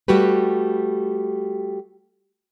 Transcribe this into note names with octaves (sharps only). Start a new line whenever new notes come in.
G3 A3 F#4 G4 B4